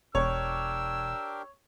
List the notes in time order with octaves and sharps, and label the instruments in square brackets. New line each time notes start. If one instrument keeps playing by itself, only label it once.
[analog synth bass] E1 [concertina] D4 G4 A#4 [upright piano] C#5 [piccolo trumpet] E6